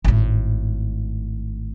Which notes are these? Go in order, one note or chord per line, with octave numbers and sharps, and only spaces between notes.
G#1 A2